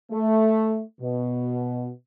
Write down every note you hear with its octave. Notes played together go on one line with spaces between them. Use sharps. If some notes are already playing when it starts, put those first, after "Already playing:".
A3
B2